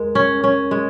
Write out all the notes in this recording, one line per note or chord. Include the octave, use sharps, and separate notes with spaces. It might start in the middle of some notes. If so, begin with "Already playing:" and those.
Already playing: G#3 A#4
C#4
C#4
G#3